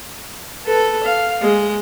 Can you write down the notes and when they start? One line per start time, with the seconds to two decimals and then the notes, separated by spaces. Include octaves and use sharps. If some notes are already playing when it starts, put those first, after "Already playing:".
0.66 A4 B4
1.04 F5
1.41 G#3